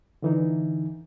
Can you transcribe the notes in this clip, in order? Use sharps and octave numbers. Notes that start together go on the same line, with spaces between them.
D3 E3 D#4